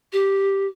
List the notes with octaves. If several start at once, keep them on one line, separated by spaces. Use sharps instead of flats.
G4